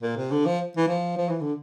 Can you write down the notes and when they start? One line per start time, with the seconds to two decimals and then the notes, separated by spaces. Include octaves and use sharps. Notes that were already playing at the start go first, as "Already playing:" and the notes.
0.02 A#2
0.16 C3
0.31 D3
0.46 F3
0.77 E3
0.88 F3
1.17 F3
1.29 E3
1.41 D3